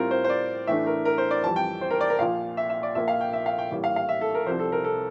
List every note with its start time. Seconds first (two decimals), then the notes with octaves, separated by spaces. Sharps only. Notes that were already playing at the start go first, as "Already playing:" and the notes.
Already playing: A2 G3 C4 F4 A#4
0.11 C5
0.24 C5
0.30 D5
0.67 A2 E3 A3 D4 E5
0.87 A#4
1.05 A#4
1.18 C5
1.31 D5
1.43 F2 E3 G3 A5
1.56 G5
1.81 C5
1.91 A#4
2.01 D5
2.10 A#4
2.19 A#1 A#2 F3 F5
2.57 E5
2.70 E5
2.83 D5
2.95 A#1 A#2 F3 A#3 F4 E5
3.08 F5
3.21 G5
3.33 E5
3.46 F5
3.58 G5
3.71 A1 A2 G3 A#3
3.84 F5
3.96 F5
4.09 E5
4.21 A4
4.35 A#4
4.46 C2 C3 F3 C5
4.59 A4
4.72 A#4
4.84 A4